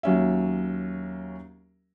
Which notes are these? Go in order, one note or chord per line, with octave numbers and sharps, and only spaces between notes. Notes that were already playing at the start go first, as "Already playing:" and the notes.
D#2 F#3 C#4 E5